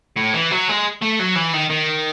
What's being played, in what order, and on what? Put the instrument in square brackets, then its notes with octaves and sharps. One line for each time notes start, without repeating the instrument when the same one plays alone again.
[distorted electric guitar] A2
E3
F#3
G#3
A3
F#3
E3
D#3
D#3